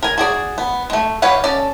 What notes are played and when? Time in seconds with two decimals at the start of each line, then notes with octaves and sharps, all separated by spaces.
0.03 A#4 G#5
0.18 F#4 G#4 D5
0.58 B3
0.90 G#3 A3
1.22 G3 B4 C#5 F5 F#5
1.44 C#4 A4 D5